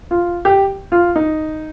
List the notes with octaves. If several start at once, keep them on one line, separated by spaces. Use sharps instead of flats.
F4
G4
F4
D#4